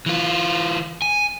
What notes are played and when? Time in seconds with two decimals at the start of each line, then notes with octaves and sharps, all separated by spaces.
0.06 E3 F4
1.02 G#5